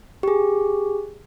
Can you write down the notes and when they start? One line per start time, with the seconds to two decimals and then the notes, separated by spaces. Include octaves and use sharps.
0.23 G4 G#4